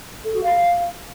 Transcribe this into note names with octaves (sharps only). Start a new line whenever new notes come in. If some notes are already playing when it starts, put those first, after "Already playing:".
A4
F#4
F5